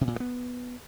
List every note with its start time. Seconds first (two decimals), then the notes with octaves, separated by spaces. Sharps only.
0.01 C3
0.07 A#2
0.14 G2
0.20 B3